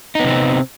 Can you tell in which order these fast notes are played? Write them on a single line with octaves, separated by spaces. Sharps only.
D#4 B3 C3 C4